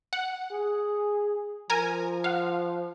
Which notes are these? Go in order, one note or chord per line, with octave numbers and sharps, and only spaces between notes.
F#5
G#4
F3 A#4 G#5 A#5
F5 F#5